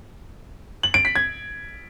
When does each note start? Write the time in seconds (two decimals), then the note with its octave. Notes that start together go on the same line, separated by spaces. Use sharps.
0.83 F#7
0.94 D7
1.05 B6
1.16 G#6